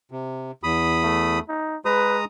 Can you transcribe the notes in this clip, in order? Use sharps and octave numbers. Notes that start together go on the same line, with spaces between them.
C3
E2 B5 D#6
A3
D#4
G#3 B4 A#5 D#6